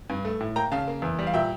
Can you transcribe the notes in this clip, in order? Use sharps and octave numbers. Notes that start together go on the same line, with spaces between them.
G2
A3
A2
A#3 G5 A#5
C#3 F5 A5
A#3
E2
G3
F5
A#2 E5 G5